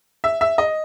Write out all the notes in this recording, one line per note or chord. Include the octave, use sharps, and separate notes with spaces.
E5
E5
D#5